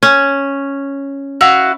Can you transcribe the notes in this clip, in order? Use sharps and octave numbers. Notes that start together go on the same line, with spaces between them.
C#4
E4 F#4 F5